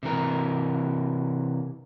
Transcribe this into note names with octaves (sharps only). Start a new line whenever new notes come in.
C3 E3 A#4